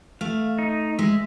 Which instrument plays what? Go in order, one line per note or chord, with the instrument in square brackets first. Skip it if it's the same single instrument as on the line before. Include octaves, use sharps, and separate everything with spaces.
[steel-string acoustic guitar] A3 [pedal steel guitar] F5
[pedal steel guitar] D#4
[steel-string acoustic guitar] G#3 [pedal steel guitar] E5